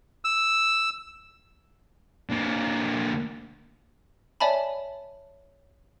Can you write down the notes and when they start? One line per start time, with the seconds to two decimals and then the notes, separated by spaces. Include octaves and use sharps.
0.25 E6
2.29 D3 A#3
4.40 C#5 D5 E5 G#5 A5 B5